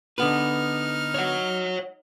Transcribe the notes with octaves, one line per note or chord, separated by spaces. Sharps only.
D3 B3 D#4 B4 F6
C#5 F#5